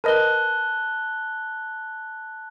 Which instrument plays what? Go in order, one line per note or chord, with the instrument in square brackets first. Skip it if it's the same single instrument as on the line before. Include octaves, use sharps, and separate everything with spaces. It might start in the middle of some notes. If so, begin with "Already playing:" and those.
[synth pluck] A#4 B4 D#5 [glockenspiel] A5 F#6 G7